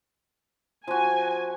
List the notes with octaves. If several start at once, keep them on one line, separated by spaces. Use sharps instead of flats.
F3 F#4 G#5